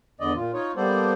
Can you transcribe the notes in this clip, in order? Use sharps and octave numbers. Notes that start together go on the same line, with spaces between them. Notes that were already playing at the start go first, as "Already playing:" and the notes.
E2 D3 D5 D#5
A#2 F4
D#4 F4 C#5
G3 A#3 B3 A4 C5 D5